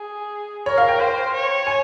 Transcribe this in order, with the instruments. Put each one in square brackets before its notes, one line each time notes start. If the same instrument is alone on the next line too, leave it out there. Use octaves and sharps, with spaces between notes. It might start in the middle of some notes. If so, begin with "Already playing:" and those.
Already playing: [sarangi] G#4
[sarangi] A#4 [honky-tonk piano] C#5
[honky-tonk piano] F5
G5
[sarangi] C5
C#5
[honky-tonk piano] G#5